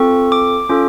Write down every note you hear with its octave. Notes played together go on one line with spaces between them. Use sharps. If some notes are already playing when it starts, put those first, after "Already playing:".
Already playing: C4 F4 A4 C#6
D6
C#4 F4 A4